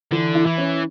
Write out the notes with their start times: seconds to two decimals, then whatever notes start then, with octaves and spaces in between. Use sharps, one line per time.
0.11 D3 E3
0.35 E4
0.46 E3
0.58 C#4